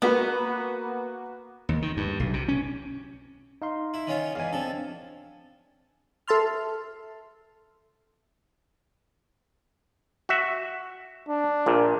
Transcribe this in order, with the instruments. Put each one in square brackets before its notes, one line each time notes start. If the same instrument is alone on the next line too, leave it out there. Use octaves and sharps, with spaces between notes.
[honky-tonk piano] A#3 F#4 B4 [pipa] B3
[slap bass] D#2
D#3
G2
B1
C3
C#4
[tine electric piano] D#4 F5 C6
[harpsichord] E4
D#3 C#4 F4
[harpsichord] E2 G#2 [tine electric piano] F5 G#5
[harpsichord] F3 A4 [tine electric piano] C4 D4
[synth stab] A4 E5 A5 C6 F6
[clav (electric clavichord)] F#4 E5
[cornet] D4
[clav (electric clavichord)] A#1 A#2